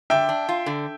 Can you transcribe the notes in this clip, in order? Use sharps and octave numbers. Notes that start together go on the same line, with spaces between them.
D3 E5 G5
D4
F4
D3